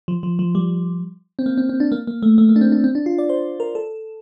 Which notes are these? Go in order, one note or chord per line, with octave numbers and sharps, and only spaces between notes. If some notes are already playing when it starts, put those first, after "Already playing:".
F3
F3
F3
G3
C4
A#3
C4
C4
D4
A#3
A#3
A3
A3
A#3
D4
C4
D4
C4
D4
F4
D5
C5
A#4
A4